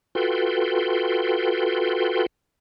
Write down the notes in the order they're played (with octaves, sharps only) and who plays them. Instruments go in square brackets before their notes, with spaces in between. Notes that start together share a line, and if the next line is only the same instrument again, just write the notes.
[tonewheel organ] F4 F#4 A4 B4 G5 C6